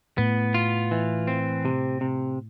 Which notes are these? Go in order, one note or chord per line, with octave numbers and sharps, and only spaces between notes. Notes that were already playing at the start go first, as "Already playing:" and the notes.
A2 B3
F4
E3
C4
C3
C3